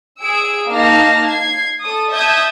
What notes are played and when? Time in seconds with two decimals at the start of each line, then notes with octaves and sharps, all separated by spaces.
0.21 G#4 E6 D7
0.69 A#3 D#4 F5 A5 F6 A#6
1.25 G#6 C7
1.80 A4 D#6
2.11 E5 A5 D#6 G6 G#6